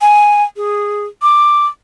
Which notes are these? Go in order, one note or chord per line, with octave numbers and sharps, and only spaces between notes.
G#5
G#4
D6